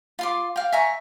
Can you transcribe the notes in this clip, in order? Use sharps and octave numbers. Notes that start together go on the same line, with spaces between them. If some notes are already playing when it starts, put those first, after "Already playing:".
F4 C6 D6
F5 G5
E5 G#5 A#5 C#6